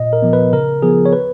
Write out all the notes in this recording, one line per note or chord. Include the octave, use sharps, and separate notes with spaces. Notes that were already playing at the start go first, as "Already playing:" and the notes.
Already playing: A#2 D#5
A#4
F3 B3
B4
C#3 A#4
F3 B3 G#4
C#5
B4